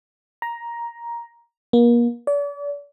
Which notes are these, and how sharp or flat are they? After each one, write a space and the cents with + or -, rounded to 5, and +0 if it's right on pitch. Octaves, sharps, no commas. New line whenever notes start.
A#5 +10
A#3 +35
D5 -40